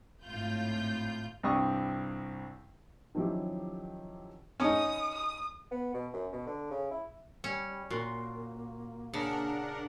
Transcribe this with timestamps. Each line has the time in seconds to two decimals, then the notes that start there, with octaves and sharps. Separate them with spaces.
0.24 G#1 A2 F4 G6
1.43 C2 G2 C4 G4 C#6 D#6
3.15 D#3 F3 F#3 C#4 E4 G4
4.60 C#4 D#4 D#6
5.15 D#6
5.71 B3
5.94 B2
6.13 F#2
6.33 B2
6.47 D3
6.71 C#3
6.91 E4
7.44 G3 C#4
7.90 A#2 A#3 F#4 C6
9.14 C#3 D4 A#4 F#5